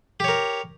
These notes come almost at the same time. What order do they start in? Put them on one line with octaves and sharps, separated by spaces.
G4 C#5 A#4